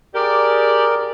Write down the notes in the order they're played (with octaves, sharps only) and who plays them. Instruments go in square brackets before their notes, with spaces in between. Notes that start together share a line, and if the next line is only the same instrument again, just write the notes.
[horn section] G4 G#4 D5 [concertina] A#4